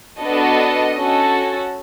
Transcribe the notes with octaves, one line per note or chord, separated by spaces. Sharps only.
B3 D4 F#4 A4 D#5
C#4 F#4 A4